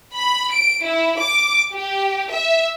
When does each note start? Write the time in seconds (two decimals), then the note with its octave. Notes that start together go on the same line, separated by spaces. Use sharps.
0.14 B5
0.53 D7
0.84 E4
1.18 D6
1.73 G4
2.31 E5